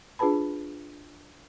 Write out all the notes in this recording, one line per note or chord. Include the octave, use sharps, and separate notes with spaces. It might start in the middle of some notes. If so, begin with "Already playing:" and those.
D4 F4 G#4 B4 A5 B5